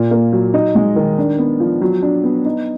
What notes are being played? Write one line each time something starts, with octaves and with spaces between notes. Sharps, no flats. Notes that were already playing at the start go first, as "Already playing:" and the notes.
Already playing: A#2
A#3
F#3
D#4
G#3
D#3
D4
B3
F3
F#3
D4
B3
D#4